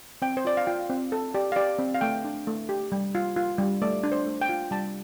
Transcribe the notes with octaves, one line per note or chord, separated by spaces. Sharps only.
C4 G5
C5
F4 D5
F5
F4 G5
C4
C4 A4
G4 D5
F5
G4 D5
C4
F5
A3 G5
D4
A3
G4
G3
F4
F4
G3
A3 D5
D4
C5
A3
G5
F4
G3 A5